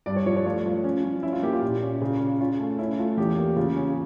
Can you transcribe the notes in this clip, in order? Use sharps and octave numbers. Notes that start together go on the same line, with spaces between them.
G2 D5
C#5
F3 C#5
C#5
A3 F4
F3
C#4
F3
C#4 E4
F4
A#3 G4
F4
A#2
C#4
C#3
C#4
C#4 F4
A3
C#4 E4
A3 F4
E2 G4
A#3
C#3 F4
C#4